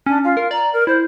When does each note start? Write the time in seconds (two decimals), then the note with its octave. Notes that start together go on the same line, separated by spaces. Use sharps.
0.06 C#4 D4
0.24 F4
0.37 A#4
0.51 D5 A#5
0.73 A#4
0.87 E4 C5